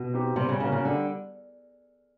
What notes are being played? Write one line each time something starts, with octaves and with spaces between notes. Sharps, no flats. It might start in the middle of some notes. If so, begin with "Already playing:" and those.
Already playing: B2
C4 D#4 G4
C3 G3
C#3
C#3 A#3 C#4 F#4
C#3
D3 G3